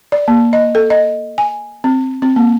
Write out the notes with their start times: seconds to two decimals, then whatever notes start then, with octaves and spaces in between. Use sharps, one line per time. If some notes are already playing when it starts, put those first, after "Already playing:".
0.12 D5
0.28 A#3
0.53 D#5
0.75 A4
0.90 D#5
1.38 G#5
1.84 C4
2.22 C4
2.36 A#3